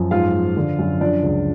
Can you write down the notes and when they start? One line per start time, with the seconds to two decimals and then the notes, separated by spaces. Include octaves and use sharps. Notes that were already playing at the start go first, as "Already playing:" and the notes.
Already playing: F#2 F3
0.11 G#2 F4 F5
0.33 F3
0.57 D3
0.79 F#2
1.00 F3 D4 D5
1.23 C#2